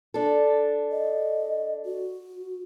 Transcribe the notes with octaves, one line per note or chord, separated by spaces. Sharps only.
D4 A4
D#5
F#4